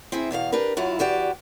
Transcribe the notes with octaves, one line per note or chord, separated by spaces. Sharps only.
C4 E4 G#4 E5
E2 B2 E5 F5
D4 G4 A#4 B4
F#2 F#3 E4 F4
E2 F#4 G4 D5